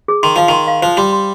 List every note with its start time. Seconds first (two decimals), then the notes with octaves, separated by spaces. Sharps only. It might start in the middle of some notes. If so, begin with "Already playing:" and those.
0.08 G#4
0.23 D#3 C6
0.36 F3 F5
0.48 D#3 C6
0.67 F5
0.82 F3 C5
0.97 G3 C6
1.12 C6